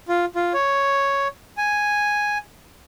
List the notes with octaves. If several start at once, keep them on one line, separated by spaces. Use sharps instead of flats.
F4
F4
C#5
G#5